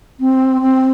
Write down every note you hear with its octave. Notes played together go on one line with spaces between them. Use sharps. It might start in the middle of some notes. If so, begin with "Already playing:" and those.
C4
C4